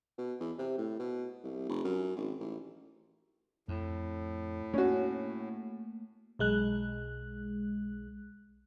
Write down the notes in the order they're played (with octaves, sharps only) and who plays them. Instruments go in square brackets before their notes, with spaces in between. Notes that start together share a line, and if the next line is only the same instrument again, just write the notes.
[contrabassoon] B2
E2
C3
A2
B2
C2
F1
F#2
G#1
A1
[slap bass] F2 [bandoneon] A2
[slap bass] A3 A#3 [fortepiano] C#4 F#4
[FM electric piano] B1 G#3 F#6